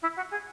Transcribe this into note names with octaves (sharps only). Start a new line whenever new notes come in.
E4
F#4
G#4